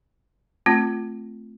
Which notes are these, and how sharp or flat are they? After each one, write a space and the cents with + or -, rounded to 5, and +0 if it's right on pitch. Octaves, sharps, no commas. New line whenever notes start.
A3 +0 C4 +0 F4 -5